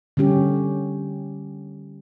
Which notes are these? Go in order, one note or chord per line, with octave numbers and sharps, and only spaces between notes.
D3 G3 C#4 G4